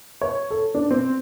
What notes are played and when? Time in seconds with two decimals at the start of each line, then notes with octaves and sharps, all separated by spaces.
0.21 C#5
0.51 A4
0.75 D4
0.91 C4